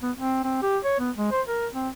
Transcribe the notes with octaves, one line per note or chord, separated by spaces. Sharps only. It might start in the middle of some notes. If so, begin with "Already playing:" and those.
B3
C4
C4
G4
C#5
B3
G#3
C5
A#4
C4